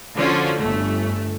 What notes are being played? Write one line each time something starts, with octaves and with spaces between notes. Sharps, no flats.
D3 F3 C#4 F4 F#4
G1 A3